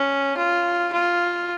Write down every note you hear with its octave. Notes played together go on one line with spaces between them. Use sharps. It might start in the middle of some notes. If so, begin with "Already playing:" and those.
Already playing: C#4
F4
F4